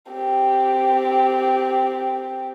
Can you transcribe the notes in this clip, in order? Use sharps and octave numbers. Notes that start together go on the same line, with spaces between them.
C4 G4